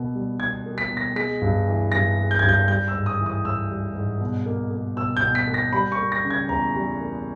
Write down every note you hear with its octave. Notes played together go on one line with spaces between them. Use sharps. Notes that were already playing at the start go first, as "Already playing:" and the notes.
Already playing: B2 A#3
G3
B2 G#6
A#3
B6
B2
A#6
G#3 B6
G2
E3
G2 A#6
G#3
G6
G2 G#6
G6
G3 G6
E6
G#2
D#6
E3
D#6
G#2 E6
G3
G#2
B2
A#3
A#3
B2 E6
G6
B2
B6
A#3
A#6
G3 B5
C#6
A#3
A#6
C#3
G#6
E2 A#5
G3
A#3